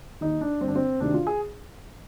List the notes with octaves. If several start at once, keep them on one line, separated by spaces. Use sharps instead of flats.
D#2 D#3 D#4
D4
G2 D3 C4
D4
C4
D2 C3 D#3 D4
F4
G#4